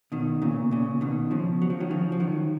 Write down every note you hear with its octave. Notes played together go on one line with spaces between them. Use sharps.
B2 D#3
A#2 C#3
A#2 C#3
B2 D#3
C#3 F3
F#3
F3
D#3 F#3
C#3 F3
F3
D#3 F#3